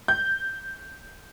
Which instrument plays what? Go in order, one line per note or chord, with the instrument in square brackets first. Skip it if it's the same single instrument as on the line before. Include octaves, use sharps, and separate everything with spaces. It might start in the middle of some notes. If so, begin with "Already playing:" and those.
[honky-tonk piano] G6